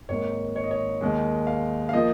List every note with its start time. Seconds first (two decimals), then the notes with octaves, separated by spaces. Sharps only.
0.09 G#1 G#2 D#3 A#3 C#5
0.56 C#5
0.64 D#5
0.71 C#5
1.01 D#2 D#3 G#3
1.47 F5
1.89 F5
1.93 F3 A#3 D#5